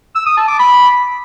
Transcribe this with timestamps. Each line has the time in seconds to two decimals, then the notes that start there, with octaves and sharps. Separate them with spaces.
0.15 E6
0.26 D#6
0.37 A5
0.48 D6
0.59 B5